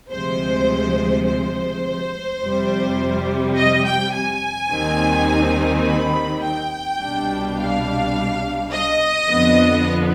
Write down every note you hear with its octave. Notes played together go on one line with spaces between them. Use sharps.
D2 C3 F3 G#3 C5
C5
F2 C3 G3
D#5
G5
G#5
D#2 D#3 G3 C4 D#4
B5
G5
C2 B2 G3 D4
F5
D#5
F2 D3 F3 B3